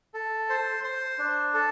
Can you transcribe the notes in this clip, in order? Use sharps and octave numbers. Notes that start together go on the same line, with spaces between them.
A4
C5
C5
D4
A4